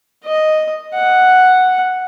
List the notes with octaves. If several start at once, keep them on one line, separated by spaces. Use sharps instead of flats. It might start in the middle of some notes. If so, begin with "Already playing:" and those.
D#5
F#5